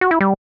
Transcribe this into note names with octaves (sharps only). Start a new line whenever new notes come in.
F#4
E4
G3